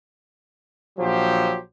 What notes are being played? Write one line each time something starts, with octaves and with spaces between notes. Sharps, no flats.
A#1 F3 F#3 G4 C5